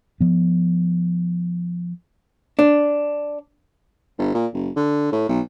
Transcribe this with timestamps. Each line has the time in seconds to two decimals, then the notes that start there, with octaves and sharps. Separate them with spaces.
0.21 F3 B3
2.59 D4
4.18 G1
4.34 A#2
4.54 F#1
4.76 D3
5.12 A2
5.29 B1